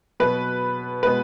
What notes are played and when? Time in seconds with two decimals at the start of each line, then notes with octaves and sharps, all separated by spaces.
0.20 B2 F#3 B3 B4
1.03 B2 G#3 B3 B4